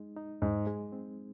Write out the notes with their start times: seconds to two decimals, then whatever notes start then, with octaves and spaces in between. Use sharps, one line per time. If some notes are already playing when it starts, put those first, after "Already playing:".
Already playing: G#3 D#4
0.16 D#4
0.42 G#2 G#3
0.67 G#3
0.92 C4